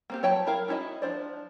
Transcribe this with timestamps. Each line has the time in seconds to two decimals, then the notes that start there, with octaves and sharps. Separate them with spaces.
0.10 A#3 C4 G4
0.23 F#3 C#5 G5 A5 B5
0.47 E4 A#4 F5
0.68 C#4 D#4 E4 F#4 D#5
1.02 F3 D4 C5 D5